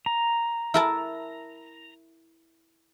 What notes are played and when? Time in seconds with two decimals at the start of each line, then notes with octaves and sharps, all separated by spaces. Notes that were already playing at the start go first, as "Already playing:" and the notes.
0.06 A#5
0.74 E4 A#4 A5